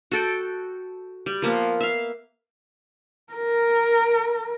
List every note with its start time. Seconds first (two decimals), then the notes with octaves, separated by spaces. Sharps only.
0.11 F#4 A4 G5
1.26 G3
1.42 F3 A#3 B3
1.80 E5 F5
3.33 A#4